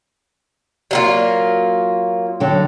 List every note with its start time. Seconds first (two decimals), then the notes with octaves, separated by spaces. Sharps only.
0.91 F#3 A#3 F4
2.40 D3 F#3 G5